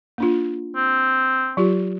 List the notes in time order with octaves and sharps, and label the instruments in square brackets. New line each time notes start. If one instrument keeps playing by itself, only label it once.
[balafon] A#3 D4 F4
[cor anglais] C4
[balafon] F#3 F4 G4